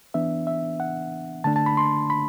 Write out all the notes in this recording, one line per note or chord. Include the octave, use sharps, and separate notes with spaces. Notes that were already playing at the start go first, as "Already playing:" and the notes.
E3 B3 D4 E5
E5
F#5
D3 A3 D4 A5
A5
B5
C6
B5